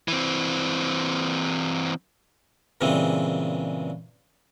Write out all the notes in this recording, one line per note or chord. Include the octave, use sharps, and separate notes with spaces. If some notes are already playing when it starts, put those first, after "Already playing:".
E3 C4
G2 A#2 C#3 E3 G#3 C4